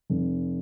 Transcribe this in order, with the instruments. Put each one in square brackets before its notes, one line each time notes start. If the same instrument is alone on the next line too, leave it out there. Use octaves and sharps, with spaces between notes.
[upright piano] F1